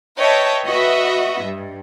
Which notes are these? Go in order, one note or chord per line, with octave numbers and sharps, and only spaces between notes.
B4 C#5 D#5 E5 G5 A5
F#4 B4 D#5 E5
G2